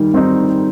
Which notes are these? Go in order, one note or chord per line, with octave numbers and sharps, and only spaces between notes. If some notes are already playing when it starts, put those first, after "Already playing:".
Already playing: D#3 G3
G3 C4 D#4